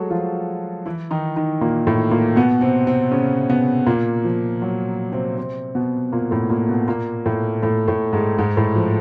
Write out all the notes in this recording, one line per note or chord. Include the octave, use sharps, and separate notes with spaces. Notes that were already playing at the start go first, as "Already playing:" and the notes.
Already playing: F#3 G#3 A3 F#4 G#4 A4
F3 F4
E3 E4
D#3 D#4
D#3 D#4
A#2 A#3
A2 A3
A#2 A#3
B2 B3
C3 C4
C3 C4
C#3 C#4
B2 B3
A#2 A#3
F3
F#3
C3 C4
C3 C4
B2 B3
A#2 A#3
A2 A3
A#2 A#3
B2 B3
A#2 A#3
A2 A3
A2 A3
A2 A3
G#2 G#3
G#2 G#3
A2 A3
F3